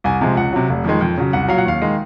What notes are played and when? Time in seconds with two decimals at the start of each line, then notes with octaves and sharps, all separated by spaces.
0.04 C2 G#5
0.21 C3 F3 G#3
0.36 C#2 F#5
0.53 C3 F#3
0.70 F1
0.84 F2 D#3 G#3
1.01 F2
1.18 C#3 F#3
1.33 C2 F#5
1.48 A#2 F#3 F5
1.58 F#5
1.66 D#2 F5
1.82 D#3 G#3